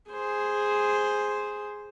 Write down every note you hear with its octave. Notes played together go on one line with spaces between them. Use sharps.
G#4 C5